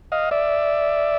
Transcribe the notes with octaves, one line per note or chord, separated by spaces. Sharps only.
D#5 F5
D5 E5